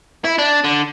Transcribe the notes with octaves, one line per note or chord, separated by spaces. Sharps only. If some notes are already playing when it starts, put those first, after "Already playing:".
E4
D4
D3